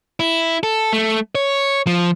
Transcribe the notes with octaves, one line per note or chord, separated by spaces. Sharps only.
E4
A4
A3
C#5
F3